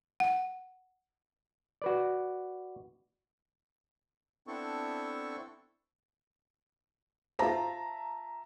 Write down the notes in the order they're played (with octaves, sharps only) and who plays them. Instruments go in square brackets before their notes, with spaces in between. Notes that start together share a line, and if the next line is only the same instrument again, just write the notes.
[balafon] F#5
[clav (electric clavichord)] F#4 B4 D5
[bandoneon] B3 C4 D4 E4 A4 C#6
[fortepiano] F4 C5 [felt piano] E5 A5 A#5